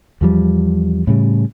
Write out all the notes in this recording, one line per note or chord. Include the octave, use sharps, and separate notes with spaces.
E2 F3 G3
A2 C#3 G3